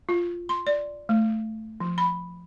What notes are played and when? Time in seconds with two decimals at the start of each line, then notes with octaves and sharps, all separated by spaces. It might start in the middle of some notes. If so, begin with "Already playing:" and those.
0.09 F4
0.49 C6
0.67 D5
1.09 A3
1.80 F3
1.98 B5